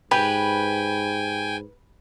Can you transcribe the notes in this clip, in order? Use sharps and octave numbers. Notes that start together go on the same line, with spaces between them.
G#2 G4 B4 G5 G#5